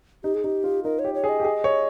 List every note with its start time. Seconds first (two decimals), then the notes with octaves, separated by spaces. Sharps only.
0.24 D#4 G4
0.35 G#4
0.44 D#4 G4
0.64 F4
0.84 D#4 A#4
0.99 C#5
1.04 G4
1.14 C#5
1.24 G#4
1.29 D#5
1.40 G4
1.45 G#4
1.64 C#5